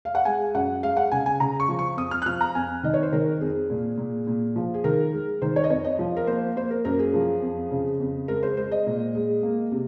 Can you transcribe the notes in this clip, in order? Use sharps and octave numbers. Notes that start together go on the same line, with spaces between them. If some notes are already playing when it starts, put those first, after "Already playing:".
F5
F#5
G#3 G#5
F#2 F#5
G#3 F5
F#5
C#3 G#5
G#5
C#3 A#5
C#6
F3
C#6
F2 D#6
F6
F#6
F3 F6
A#5
F2 G#5
D#3 D#5
C#5
C5
D#3 A#4
F2 G#4
A#2
A#2
A#2
F3
G#4
D#3 A#4
G#3
D#3 C5
C#5
D#5
F2 C#5
D#5
F3
A#4
A#3 C5
A#3 C5
A#4
F#2 A#4
G#4
F3
F2
C#3
F2
G#3 A#4
C5
G#3 C5
D#5
A#2
G#3
A#3
C3